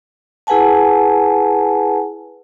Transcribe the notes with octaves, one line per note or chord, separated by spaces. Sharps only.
E4 G#4 B4 F#5 G#5 A5